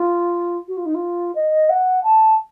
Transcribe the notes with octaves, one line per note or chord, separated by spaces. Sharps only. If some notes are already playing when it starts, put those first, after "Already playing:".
Already playing: F4
F#4
F4
D#4
F4
D#5
F#5
A5